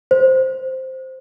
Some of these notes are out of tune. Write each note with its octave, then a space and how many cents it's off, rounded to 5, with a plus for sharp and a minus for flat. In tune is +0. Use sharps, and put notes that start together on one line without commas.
C5 +0